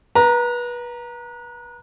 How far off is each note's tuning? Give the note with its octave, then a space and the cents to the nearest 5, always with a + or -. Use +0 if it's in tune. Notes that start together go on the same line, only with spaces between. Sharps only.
B4 -30 A#5 +0